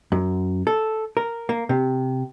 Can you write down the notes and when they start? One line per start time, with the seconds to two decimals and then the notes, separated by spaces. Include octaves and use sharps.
0.12 F#2
0.67 A4
1.17 A#4
1.49 A#3
1.69 C3